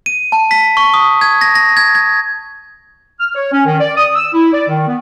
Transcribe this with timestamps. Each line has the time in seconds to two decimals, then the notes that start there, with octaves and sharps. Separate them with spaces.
0.06 D#7
0.32 A5
0.51 B6
0.77 C#6
0.94 D#6
1.21 G#6
1.41 A#6
1.55 A#6
1.77 G#6
1.95 G#6
3.20 F6
3.35 C#5
3.52 C#4
3.65 D#3
3.80 D5
3.97 D#6
4.14 E6
4.33 E4
4.53 D5
4.68 D#3
4.88 B3